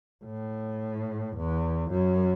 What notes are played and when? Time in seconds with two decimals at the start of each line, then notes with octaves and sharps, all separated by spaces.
0.25 A2
1.36 E2
1.90 F#2